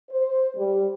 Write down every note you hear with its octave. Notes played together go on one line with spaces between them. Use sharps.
C5
G3